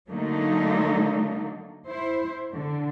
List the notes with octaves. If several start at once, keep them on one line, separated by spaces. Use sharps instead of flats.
D3 F#3 A3 A#3 D4 D#4
E4 C5
D3